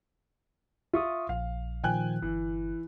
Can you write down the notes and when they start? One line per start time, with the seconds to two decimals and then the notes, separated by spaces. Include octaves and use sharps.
0.94 F4 E5 C#6 D#6
1.29 A#1 F5
1.84 A#2 D#3 F3 G5 G#5 F#6
2.22 G1 E3